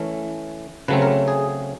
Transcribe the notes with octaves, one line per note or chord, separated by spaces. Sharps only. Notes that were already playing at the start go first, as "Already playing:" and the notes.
Already playing: E3 A3 C#4
C#3 F#3 A3 C4 B4
A#4
G#4